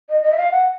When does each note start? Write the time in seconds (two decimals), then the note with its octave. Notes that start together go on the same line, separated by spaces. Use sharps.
0.09 D#5
0.24 D#5
0.32 E5
0.37 F5
0.51 F#5